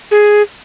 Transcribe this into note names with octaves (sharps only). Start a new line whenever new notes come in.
G#4